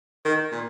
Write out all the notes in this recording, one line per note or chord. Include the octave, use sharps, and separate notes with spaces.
D#3
A#2